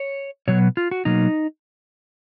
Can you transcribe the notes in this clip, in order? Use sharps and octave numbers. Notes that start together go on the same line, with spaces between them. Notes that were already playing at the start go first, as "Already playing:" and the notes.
Already playing: C#5
B2 F#3 B3 C#5
F4
F#4
B2 F#3 A#3 D#4